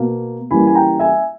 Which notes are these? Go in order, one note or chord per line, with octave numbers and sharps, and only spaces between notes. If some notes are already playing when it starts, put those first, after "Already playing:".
Already playing: B2 A#3
C#3 E3 G3 A#3 G#5 B5
G#5
G5 A#5
E5 G#5